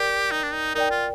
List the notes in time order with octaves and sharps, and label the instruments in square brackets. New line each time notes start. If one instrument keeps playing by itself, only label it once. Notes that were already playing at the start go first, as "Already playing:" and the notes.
Already playing: [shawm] G4 [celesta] A#4 D5 G5
[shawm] D#4
D4
D#4
[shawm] D#4 [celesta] A#4 D5 G5
[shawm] F4